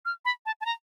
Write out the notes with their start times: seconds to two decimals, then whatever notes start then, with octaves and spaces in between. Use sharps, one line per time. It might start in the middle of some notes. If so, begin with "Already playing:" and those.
0.05 F6
0.25 B5
0.46 A5
0.61 A5
0.65 A#5